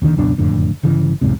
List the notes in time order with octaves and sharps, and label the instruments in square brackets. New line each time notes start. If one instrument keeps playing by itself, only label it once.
[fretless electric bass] E1 D#2 D3 D#3
C#2 F#2 B2 D4
F#1 F2 A2 D3
G1 C#3 E3
B1 E2 G#2 C3